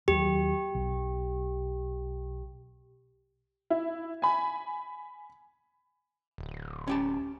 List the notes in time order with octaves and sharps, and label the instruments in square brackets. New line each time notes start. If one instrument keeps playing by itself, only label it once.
[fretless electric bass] D#2 F#3 [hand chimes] G4
[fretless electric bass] B1
[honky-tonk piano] E4
G#5 B5
[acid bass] D1
[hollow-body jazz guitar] C#4 G4 A5